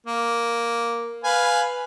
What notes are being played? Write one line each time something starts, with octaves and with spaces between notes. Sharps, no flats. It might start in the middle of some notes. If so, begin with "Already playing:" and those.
A#3
B4 F5 G#5